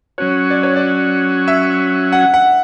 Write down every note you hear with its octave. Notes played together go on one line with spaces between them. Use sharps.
F#3 C#4 F#4 C#5
D5
C#5
D5
E5
F#5
F#5